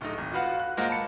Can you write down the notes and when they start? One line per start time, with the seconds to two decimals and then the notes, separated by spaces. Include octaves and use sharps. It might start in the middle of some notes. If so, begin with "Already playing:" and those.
0.01 D1 A3 D#4
0.18 G#1
0.33 F4 F#4 B4 F5 F#5
0.59 F#6
0.77 G#3 A#3 F4 A#4 C5 F#5
0.89 A5 B5 C#7